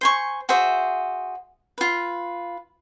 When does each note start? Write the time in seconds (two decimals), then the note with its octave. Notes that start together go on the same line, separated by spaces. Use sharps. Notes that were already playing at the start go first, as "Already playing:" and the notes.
0.01 C5 G#5 C#6
0.49 F#4 G#4 C5 E5
1.78 F4 B4